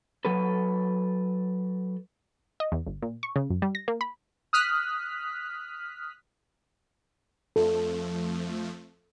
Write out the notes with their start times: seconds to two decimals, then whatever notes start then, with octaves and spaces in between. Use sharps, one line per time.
0.25 F#3 A4 B4
2.60 D#5
2.72 E2
2.87 G1
3.02 A#2
3.23 C#6
3.36 C#3
3.50 F#2
3.62 G3
3.75 A#6
3.88 A#3
4.01 B5
4.53 D#6 F6 F#6 B6
7.56 F2 F3 A3 A4